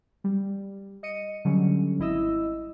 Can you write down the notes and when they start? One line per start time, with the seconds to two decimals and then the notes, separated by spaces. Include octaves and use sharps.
0.24 G3
1.03 D#5 C#7 D#7
1.45 D3 F#3 G3 C#4
1.99 G#1 E4 D#5 E6